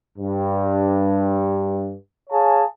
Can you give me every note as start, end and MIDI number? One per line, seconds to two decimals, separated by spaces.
0.18 1.93 43
2.30 2.62 68
2.30 2.62 73
2.30 2.62 77
2.30 2.62 80
2.30 2.62 81